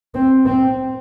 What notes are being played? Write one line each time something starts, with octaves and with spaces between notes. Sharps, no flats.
C4
C4